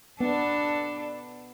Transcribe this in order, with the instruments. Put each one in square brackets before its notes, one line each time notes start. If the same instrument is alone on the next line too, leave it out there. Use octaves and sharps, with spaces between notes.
[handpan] B3 [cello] D4 A4